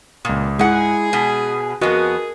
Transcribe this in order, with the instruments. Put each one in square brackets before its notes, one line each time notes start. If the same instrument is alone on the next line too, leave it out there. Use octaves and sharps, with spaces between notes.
[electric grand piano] C#2 D#6 [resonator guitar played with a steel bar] A#2
[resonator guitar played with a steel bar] G#2 F#5 [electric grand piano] G#3 [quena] E4 [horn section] G#4
[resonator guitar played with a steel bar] B2 [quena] D#6
[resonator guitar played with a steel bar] F2 B3 [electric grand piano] F#4 D#5 [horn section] G#4 [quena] A#4